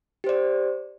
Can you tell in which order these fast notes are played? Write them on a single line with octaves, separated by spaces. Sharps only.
G4 C5 D5